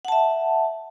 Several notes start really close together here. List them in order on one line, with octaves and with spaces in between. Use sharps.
F#5 A5 E5